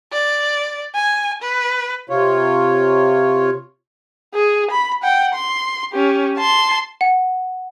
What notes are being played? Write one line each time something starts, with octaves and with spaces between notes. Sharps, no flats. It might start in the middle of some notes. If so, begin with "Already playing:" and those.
D5
G#5
B4
C3 F4 C#5
G#4
B5
F#5 G5
C6
C#4 G4
A5 C6
F#5